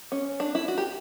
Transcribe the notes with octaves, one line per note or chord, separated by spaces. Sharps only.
C#4
D4
E4
F#4
G4